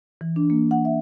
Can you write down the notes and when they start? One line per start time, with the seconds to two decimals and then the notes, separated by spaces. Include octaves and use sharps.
0.21 E3
0.36 D4
0.50 A#3
0.71 F#5
0.85 E5